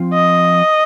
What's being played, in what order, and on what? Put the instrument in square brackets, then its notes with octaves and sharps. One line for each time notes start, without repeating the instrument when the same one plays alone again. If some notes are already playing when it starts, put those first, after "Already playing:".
Already playing: [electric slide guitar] F3 C4 F4
[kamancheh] D#5